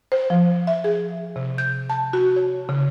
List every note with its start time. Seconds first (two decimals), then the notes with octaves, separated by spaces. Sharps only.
0.12 C5
0.30 F3
0.67 E5
0.84 G#4
1.36 C3
1.58 G6
1.90 A5
2.13 F#4
2.36 C#5
2.69 C#3